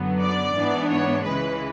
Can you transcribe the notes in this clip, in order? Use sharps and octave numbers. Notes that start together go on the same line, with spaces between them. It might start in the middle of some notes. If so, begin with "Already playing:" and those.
Already playing: F#2 D3 F#3 B3
D5
G#2 E3 B3 D4
C#5
C#2 C#3 E3 G#3 B4